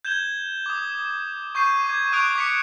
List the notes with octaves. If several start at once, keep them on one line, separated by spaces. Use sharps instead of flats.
G6 G#6 E7 G7
D6 D#6
C#6 G6 C7 D#7
D6 G#6
C#6 D#6 F#6 D7 F7
D6 B6 C#7